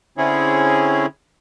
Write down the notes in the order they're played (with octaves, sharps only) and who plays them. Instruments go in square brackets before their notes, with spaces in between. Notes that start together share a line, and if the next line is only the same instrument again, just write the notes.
[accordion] D3 C4 C#4 E4 G#4 C#5